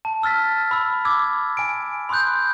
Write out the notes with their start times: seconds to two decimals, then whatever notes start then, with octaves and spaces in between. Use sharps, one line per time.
0.05 A5
0.22 A5 E6 F6 A6 B6
0.71 B5 E6
1.05 D6 E6 G#6
1.57 G#5 D7
2.09 B5 C6 D#6 F#6 G6